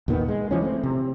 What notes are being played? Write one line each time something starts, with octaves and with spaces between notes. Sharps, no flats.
D#2 A#2 D#3 B3
G#3
E3 F3 C#4
A3 C4
C3